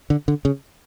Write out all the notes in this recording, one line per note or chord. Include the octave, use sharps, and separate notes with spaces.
D3
D3
C#3